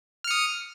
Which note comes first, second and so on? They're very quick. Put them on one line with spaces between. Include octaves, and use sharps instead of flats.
F6 C#7 D#6